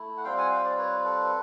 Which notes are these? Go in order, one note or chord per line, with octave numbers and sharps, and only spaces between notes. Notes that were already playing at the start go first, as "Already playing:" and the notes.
Already playing: A3 E4
F#5
G3 C4 F4 F5 G5
F#5 G#5
F5 G5
C5 D5
B4 C#5
A4 B4